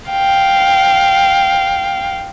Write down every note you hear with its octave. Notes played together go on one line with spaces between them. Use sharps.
F5 G5